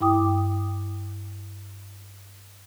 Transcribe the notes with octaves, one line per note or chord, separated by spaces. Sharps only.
G2 E4 G5 D6 D#6